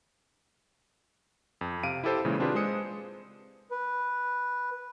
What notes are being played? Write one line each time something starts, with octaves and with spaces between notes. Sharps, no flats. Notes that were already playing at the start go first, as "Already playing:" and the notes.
F2
C3 F5 D7 D#7
E4 G4 A4 C5
A#2 C#3 E3 G#3
C4 D4 F4 G4 G#4 B4
G#3 C5 D#6 C#7
B4